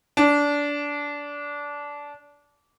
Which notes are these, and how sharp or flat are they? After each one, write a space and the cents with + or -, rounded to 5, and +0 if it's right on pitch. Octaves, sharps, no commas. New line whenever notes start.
D4 -20